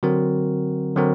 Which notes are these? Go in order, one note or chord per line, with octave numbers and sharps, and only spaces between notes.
D3 F#3 C4 F#4 A#4
D3 F#3 C4 F#4 A#4